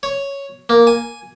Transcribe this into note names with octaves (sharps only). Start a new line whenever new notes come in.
C#5
A#3
G#5